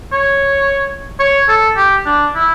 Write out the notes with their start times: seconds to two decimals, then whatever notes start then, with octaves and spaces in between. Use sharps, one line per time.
0.12 C#5
1.20 C#5
1.49 A4
1.77 G4
2.06 D4
2.35 E4